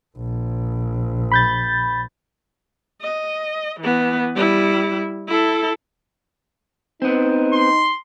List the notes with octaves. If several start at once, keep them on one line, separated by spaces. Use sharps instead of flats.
A#1
B5 G6 A6
D#5
E3 B3
G3 E4
E4 A4
B3 C4 D#4
C6